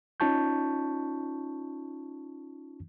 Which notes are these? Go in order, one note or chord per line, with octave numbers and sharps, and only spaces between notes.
C#4 D#4 F4 A5 C#6 G6